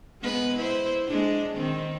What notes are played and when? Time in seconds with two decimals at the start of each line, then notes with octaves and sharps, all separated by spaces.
0.21 G#3 B3 B4
0.57 E4 C5
1.07 G#3 D4
1.56 D#3 C4